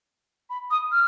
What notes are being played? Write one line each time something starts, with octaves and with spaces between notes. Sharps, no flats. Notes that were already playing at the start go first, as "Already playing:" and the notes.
B5
D#6
F6